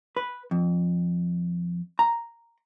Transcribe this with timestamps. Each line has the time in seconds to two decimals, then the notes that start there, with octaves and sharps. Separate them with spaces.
0.16 B4
0.51 F2
1.99 A#5